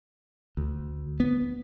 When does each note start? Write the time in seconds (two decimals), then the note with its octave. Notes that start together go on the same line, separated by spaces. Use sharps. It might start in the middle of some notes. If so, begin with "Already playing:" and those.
0.57 D2
1.20 B3